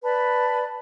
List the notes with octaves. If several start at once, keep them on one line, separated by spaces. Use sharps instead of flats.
B4 D5 A5 B5